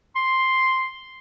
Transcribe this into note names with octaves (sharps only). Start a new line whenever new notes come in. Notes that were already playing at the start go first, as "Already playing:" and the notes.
C6